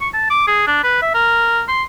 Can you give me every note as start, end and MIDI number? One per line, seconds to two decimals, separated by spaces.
0.01 0.09 85
0.14 0.26 81
0.30 0.47 86
0.47 0.67 68
0.67 0.80 62
0.83 1.02 71
1.02 1.14 76
1.14 1.62 70
1.68 1.84 84